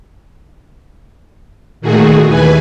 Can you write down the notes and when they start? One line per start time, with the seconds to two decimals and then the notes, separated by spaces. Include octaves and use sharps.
1.81 A#2 D#3 A3 F#4 G#4
2.26 D#2 E3 B4 G#5